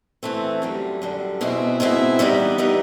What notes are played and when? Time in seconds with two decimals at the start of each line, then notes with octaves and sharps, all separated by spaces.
0.23 E3 A3 C4
0.62 F#2 D3 G3
1.02 F#2 D3 G3
1.41 B2 G#3 C4 E4
1.80 B2 G#3 C4 E4
2.19 E3 G3 B3 D#4
2.58 E3 G3 B3 D#4